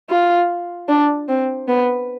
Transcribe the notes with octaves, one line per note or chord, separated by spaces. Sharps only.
F4
D4
C4
B3